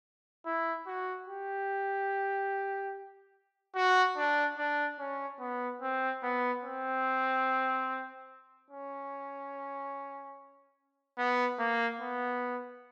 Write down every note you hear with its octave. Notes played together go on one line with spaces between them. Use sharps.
E4
F#4
G4
F#4
D4
D4
C#4
B3
C4
B3
C4
C#4
B3
A#3
B3